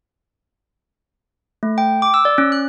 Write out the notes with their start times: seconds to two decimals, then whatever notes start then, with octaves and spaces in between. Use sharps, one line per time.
1.63 A3
1.78 G5
2.02 D6
2.14 E6
2.25 D5
2.38 C#4
2.52 F#6